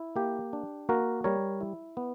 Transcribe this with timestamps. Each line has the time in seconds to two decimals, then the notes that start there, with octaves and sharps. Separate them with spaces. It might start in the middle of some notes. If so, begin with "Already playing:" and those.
Already playing: E4
0.16 A#3 G4
0.53 D4
0.89 A#3 F#4 A#4
1.24 G3 A#4 C#5
1.61 E4
1.97 B3